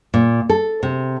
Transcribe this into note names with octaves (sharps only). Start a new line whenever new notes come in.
A#2
A4
C3